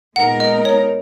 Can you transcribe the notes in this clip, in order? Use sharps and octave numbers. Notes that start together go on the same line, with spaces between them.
A#2 G#3 B3 D#4 A#4 F#5
D#5
C#5